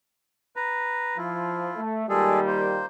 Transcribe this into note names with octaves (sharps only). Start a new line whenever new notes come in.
B4 A#5
F3 E4 F4
A3
A#2 D#3 G3 G#3 G#4 A4
A#3 C5